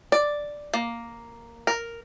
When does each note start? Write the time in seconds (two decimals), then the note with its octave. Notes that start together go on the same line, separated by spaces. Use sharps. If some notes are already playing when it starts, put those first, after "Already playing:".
0.12 D5
0.74 A#3
1.67 A#4